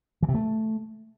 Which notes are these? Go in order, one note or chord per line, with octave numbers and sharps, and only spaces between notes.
E3
C3
A3